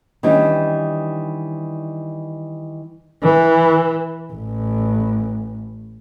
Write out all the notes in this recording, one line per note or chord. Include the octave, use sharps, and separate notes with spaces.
D#3 E3 G3 C#4 D4 G4
E3
A1